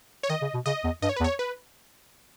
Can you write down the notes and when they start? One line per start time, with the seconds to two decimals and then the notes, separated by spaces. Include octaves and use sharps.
0.23 C#5
0.30 D#3 D#5
0.42 C#3
0.54 B2
0.66 C#3 D#5
0.84 E2
1.02 G2 D#5
1.09 C#5
1.16 B4
1.20 E2
1.24 C#5
1.39 B4